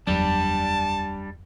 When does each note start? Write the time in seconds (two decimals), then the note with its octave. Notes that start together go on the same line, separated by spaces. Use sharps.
0.07 F#1 E2 F#3 G3 D4 A5